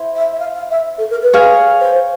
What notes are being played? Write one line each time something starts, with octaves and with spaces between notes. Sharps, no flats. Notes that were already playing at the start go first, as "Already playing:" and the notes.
Already playing: E4 C5
E5
E5
F5
F5
E5
A4
A#4
B4
G#4 C#5 F5 G#5
C5